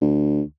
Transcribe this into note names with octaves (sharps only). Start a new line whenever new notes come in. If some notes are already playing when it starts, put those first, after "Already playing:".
D2